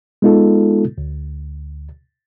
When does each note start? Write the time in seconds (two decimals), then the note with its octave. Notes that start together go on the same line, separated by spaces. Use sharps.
0.22 G#3 B3 D#4 F4 A4
0.98 D2